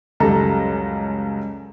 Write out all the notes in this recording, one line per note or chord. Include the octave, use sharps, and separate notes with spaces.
C#2 F#2 G3 A4 A#5